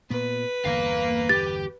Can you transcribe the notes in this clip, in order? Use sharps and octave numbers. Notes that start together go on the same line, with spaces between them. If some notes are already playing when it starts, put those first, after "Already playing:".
A#2 B3 B4
G1 E2 D3 A#3 F5
G4 A6